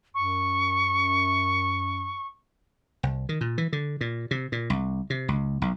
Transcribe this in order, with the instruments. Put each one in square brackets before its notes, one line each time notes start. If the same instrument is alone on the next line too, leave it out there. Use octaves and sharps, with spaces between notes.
[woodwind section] F#2 [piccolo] C#6
[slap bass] C2
D#3
A#2
E3
D3
A#2
C3
A#2
C2
C3
C#2
B1